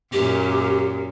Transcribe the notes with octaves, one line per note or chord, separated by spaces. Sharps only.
F#2 A#2 G4